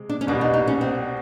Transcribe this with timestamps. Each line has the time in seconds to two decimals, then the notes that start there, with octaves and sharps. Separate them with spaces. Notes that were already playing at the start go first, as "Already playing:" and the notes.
Already playing: C3 G#3
0.09 D4
0.21 C#4
0.27 C2 B2 G3 D4
0.41 D#4
0.54 D#4
0.67 C#4
0.81 C4